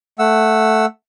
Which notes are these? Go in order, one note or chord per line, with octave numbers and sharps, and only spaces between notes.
A3 F#5 E6